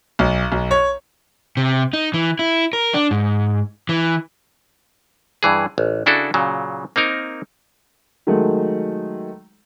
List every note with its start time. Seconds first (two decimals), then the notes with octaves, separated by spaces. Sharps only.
0.19 B1
0.52 B1
0.71 C#5
1.57 C3
1.93 D#4
2.14 E3
2.39 E4
2.73 A#4
2.94 D4
3.11 G#2
3.89 E3
5.43 G2 E3 G#4
5.78 A1
6.06 C#3 D4 E4 F#4 A4
6.34 A#2 C#3 F#3
6.96 A#3 C4 D#4 A#4
8.27 D#3 F#3 G#3 A3